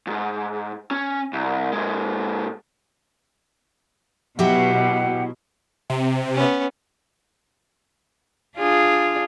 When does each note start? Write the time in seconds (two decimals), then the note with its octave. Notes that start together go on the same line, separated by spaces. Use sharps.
0.07 F2 G#2
0.91 C#4
1.33 C2
1.73 A#2 G#3
4.39 B2 F#3 G#3 E4 G4 E5 F#5
5.90 C3
6.35 B3 C#4
8.57 D4 F4 G#4